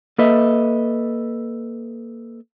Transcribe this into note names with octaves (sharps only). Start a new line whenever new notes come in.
A#3 A4 B4 D#5 E5